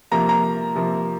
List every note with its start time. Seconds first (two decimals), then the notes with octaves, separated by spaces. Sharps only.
0.11 C3 F3 A#3 A#5
0.29 A#5
0.75 C3 F3 A#3